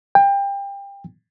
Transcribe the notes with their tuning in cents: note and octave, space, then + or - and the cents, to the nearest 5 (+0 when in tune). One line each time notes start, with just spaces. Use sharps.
G5 +25